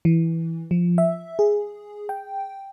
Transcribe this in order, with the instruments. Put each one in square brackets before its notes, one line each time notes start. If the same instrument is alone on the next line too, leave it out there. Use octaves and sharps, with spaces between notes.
[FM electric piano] E3
F3
E5
G#4
G5